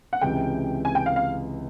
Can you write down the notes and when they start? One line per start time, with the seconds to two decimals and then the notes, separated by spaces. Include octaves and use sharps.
0.13 F#5
0.21 C#2 C3 E3 G5
0.85 G#5
0.95 G5
1.06 F5
1.16 F5